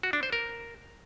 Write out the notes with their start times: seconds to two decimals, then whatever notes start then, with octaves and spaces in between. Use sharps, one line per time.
0.03 F#4
0.13 D4
0.23 C5
0.33 A#4